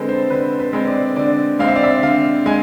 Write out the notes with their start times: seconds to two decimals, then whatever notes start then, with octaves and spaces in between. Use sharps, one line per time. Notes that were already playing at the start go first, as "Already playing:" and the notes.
Already playing: D3 G#3 C4 A4 B4
0.09 C5
0.30 D3 B4
0.59 B4
0.73 G#3 C4
0.87 D5
1.16 D3 D5
1.59 G#3 C4 F5
1.68 E5
1.76 D5
1.84 E5
2.02 D3 F5
2.46 G#3 G#5